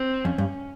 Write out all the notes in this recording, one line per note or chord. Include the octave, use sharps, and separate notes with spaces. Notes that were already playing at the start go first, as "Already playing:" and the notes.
Already playing: C4
F2 C#4
G2